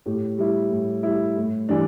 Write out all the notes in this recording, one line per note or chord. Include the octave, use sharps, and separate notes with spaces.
A2 G4
G3 E4
A2
G3 E4
A2
E3 G3 D4